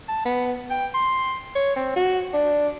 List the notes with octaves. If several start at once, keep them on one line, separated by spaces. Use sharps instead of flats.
A5
B3
G5
C6
C#5
C4
F#4
D4